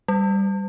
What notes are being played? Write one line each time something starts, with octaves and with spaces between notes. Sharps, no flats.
G3